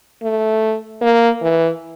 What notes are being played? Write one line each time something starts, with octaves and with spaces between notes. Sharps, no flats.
A3
A#3
E3